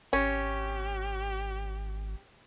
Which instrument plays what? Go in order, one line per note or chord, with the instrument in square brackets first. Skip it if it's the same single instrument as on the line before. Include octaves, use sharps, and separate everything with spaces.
[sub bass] G#1 [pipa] C#4 [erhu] G4